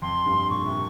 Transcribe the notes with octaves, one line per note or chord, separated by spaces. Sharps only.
F2 C6
G2
A#2 C#6
C3